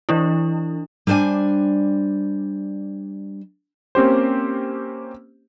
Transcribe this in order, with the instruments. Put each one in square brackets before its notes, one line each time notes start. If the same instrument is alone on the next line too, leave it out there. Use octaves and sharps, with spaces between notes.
[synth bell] E3 D4 E4
[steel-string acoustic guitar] G3 D4 C5 D5 G#5
[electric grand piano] A#3 C4 C#4 G4 C5